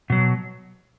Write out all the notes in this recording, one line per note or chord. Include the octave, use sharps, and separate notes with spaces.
B2 F#3